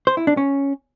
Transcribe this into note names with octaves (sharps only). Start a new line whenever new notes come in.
C5
E4
D4
C#4